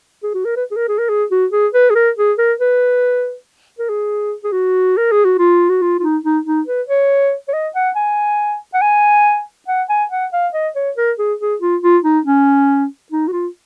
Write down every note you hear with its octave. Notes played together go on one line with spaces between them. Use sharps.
G#4
F#4
A#4
B4
G#4
A#4
G#4
A#4
G#4
F#4
G#4
B4
G#4
A#4
G#4
A#4
B4
A#4
G#4
G#4
F#4
A#4
G#4
F#4
F4
F#4
F4
F4
D#4
D#4
D#4
B4
C#5
C#5
D#5
F#5
G#5
F#5
G#5
F#5
G#5
F#5
F5
D#5
C#5
A#4
G#4
G#4
F4
F4
D#4
C#4
D#4
F#4
F4